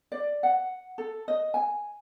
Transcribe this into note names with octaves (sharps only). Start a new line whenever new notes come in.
D5
F#5
A4
D#5
G#5